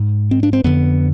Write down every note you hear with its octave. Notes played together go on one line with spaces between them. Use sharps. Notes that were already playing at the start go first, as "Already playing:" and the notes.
Already playing: G#2
C4
D4
C4
F2 D3 B3